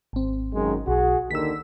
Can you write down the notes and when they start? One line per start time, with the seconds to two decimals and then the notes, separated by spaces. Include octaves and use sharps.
0.13 G#1 C4
0.53 F#2 D#3 G#3
0.87 B1 F#4 G#4
1.31 D#2 D3 D#3 E6 B6